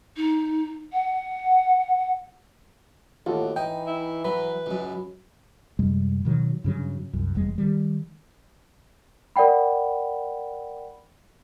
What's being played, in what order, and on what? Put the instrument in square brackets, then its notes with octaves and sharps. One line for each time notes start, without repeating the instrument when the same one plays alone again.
[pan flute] D#4
F#5
[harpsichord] D#2 [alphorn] A2 [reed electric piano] F4 F#4 A4
[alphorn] E3 [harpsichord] D#4 [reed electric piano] G5
[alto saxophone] E4
[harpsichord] F#3 [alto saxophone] B4 [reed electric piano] B5
[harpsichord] C#2 F#2
[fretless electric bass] F#2 C3 G3 G#3
B2 D#3 F3 F#3
G2 C#3 F#3
C2 F#2
F1 E2 G3 G#3
D#3 G3
[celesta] A#4 D5 F#5 G5 B5